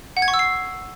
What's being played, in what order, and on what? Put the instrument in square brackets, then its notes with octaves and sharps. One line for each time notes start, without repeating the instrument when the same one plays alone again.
[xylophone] F#5
G#6
C#6
E6
C7